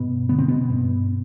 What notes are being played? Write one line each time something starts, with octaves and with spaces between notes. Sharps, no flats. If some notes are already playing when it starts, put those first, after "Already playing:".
Already playing: G2 B2 B3
D3 B3
C4
B2 B3
G2